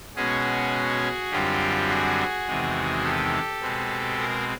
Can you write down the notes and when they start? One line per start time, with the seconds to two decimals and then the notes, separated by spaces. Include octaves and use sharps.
0.16 B2 G#3 C#4 F#4 G#4
1.31 F#2 D3 G3 C4 F4 G4
1.89 F#4 G#4
2.47 E2 C3 D#3 G#3
3.04 G4 A4
3.61 B2 G#3 C4
4.20 G#4 A#4